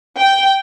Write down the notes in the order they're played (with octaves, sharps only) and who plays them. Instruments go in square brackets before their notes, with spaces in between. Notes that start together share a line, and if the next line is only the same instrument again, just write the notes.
[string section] G5